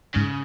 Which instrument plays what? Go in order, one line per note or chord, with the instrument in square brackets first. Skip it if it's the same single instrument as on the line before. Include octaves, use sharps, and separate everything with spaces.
[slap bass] G#2 [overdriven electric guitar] C#3